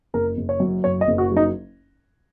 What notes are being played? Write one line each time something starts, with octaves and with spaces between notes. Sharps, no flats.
F#1 A#4
F#1
C#5
F#2
F#1 C#5
D#5
F#1
F#4
F#3
D#4